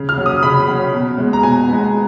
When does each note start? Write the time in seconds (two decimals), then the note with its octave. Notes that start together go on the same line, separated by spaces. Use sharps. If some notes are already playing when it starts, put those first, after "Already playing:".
Already playing: C#3
0.09 F6
0.17 F#3 C#4
0.26 D#6
0.43 C#3 B5
0.67 F#3 C#4
0.93 B2
1.18 G#3 B3
1.33 A#5
1.43 B2 G#5
1.68 G#3 B3